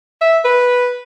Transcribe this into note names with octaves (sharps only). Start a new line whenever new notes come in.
E5
B4